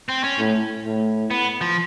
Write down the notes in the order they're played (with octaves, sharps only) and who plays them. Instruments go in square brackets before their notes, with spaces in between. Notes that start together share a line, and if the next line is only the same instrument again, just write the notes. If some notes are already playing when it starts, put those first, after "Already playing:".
[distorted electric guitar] C4
C#4
[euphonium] A2
A2
[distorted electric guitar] B3
F3